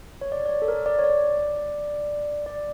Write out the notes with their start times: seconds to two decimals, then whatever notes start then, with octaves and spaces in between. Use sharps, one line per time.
0.21 C#5
0.32 D5
0.46 D5
0.49 C#5
0.62 A4
0.68 A#4
0.86 D5
0.99 C#5
1.04 D5
2.46 D5